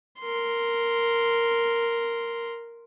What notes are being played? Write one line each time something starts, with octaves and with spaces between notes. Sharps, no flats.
A#4 C6